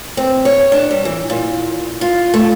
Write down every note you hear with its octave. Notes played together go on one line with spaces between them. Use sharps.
C4
C#5
D4
G3
E3
A#2
F4
A3